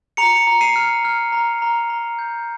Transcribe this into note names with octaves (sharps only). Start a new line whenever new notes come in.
A#5 C#7 F7
A#5
C7 D#7
F6
F6
A#5
A#5
A#5
G6